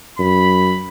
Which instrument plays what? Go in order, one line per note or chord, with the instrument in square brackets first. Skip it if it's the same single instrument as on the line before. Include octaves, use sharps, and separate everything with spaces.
[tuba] F#2 [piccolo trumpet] B5